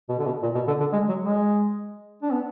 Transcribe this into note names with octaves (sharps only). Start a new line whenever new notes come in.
B2
D3
B2
A#2
B2
D3
D3
G#3
F#3
G#3
D4
B3